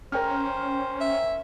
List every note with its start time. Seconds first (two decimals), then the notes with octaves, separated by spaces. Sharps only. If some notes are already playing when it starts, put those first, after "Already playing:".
0.12 C#4 A#4 C5 G5 F6
1.00 E5